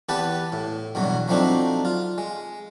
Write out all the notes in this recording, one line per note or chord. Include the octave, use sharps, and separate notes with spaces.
E2 B3 G4 B4 A5 B5
A2
E2 G2 B2 F#3
F3 F#3 A3 C4 D4 D#4
F4
G#3